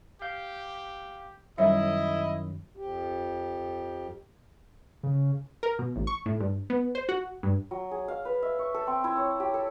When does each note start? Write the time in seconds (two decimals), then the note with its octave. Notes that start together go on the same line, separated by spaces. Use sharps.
0.22 G4 F5 G6
1.58 F#2 D#3 F#3 G3 E4 C#5 D#5 E5
2.77 F2 G4
5.03 C#3
5.63 A#4
5.79 B2
5.96 A1
6.07 C#6
6.26 A2
6.40 G2
6.70 B3
6.95 C5
7.09 F#4
7.43 G2
7.71 F#3
7.91 G#4
8.08 F5
8.25 B4
8.43 E5
8.59 C#6
8.74 A4
8.87 C4
9.04 E4
9.17 C#5
9.40 G4
9.54 A4